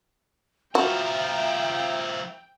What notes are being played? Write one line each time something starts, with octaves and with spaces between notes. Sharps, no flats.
F3 E4 F#4 E5 F5 G5 A#5